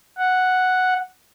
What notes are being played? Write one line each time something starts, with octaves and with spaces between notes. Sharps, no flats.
F#5